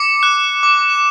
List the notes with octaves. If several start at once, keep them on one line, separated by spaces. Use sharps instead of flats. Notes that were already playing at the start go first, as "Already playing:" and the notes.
Already playing: D6 C#7
F#6
D6
E7